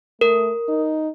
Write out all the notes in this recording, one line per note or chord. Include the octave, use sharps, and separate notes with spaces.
A3 A#4
D#4